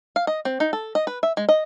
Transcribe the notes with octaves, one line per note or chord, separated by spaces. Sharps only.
F5
D#5
C4
D#4
A4
D#5
B4
E5
G#3
D#5